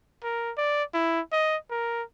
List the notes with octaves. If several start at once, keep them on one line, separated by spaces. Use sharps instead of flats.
A#4
D5
E4
D#5
A#4